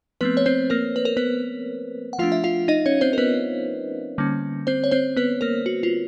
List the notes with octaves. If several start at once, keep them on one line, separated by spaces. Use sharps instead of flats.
F3 A3 B3 C4 B4
C#5
C4 C5
A#3 A#4
B4
A#4
B3 B4
F#5
F3 A3 D4 F4 F5
E5
F4 F5
D#4 D#5
C#4 C#5
C4 C5
A#4
B3 B4
D3 G3 A#3 C#4
C4 C5
C#5
C4 C5
B3 B4
A#3 A#4
F#4
F4